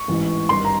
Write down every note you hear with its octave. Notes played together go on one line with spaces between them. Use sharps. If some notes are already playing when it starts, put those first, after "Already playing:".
Already playing: C#6
A1 G#2 E3
G#1 G2 D#3 C6
A#5